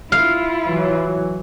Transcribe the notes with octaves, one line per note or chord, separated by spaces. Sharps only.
E4 F4 F5
E3 F#3